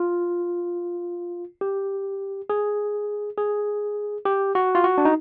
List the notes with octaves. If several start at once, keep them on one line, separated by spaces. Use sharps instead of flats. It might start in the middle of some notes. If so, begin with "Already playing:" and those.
Already playing: F4
G4
G#4
G#4
G4
F#4
F4
F#4
D4
D#4